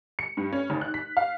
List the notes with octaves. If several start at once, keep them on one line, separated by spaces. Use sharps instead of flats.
C#7
G2
C#4
G#1
F#6
B6
F5